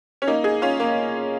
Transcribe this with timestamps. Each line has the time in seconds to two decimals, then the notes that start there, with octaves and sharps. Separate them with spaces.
0.22 C#4
0.27 A#3 D#4
0.44 D#4 G#4
0.62 C#4 F4
0.80 A#3